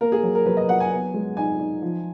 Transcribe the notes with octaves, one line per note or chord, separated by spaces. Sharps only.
A#3 A#4
G#4
F#3
A#4
F#3 B4
D#5
F#3 F#5
G#5
B3
G#3
D#4 G#5
D#4
F3